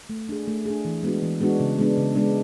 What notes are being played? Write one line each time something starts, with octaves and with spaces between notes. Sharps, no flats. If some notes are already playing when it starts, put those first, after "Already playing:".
A3
D4 G#4
A3
D4 G#4
E3
G#3 B3 D4 F#4
E3
G#3 B3 D4 F#4
C#3
G#3 B3 D4
C#3
G#3 B3 D4